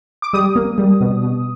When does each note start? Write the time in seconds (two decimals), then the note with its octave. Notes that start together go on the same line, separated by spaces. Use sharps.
0.22 D6
0.33 G3 D#6
0.56 A#3
0.78 G3
1.00 B2
1.23 B2